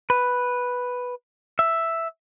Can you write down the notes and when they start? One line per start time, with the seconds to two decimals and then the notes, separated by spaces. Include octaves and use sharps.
0.10 B4
1.59 E5